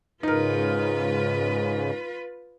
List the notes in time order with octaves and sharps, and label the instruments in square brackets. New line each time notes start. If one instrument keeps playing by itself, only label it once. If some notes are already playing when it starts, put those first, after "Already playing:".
[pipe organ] G#2 C#3 [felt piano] D#4 A#4 [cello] F4 B4